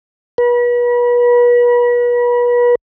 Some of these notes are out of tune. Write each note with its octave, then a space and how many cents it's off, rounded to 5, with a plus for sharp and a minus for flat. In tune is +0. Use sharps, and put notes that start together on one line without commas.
B4 -35